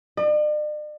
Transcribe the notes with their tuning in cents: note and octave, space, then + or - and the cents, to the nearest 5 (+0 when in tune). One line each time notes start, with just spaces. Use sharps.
D5 +45